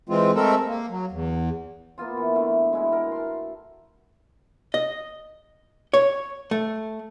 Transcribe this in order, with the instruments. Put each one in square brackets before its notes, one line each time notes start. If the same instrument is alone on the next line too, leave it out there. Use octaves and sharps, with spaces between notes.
[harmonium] E3 G#3 C4 F4
G#3 A3 C4 A4 A#4 E5
A#3
F#3
E2
[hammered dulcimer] A#3 B3 F4 C6
E3
D3 A3
G#3 E4 F#4
A#4
A5 C6
[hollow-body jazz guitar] D#5
C#5
A3